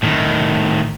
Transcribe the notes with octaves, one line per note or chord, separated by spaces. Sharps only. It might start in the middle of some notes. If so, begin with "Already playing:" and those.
A2 D#3